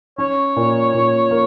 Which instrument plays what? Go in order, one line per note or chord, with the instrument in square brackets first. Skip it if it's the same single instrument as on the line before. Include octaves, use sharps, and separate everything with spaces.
[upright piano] C#4 [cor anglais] C#5
[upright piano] A#2
A#2
A#3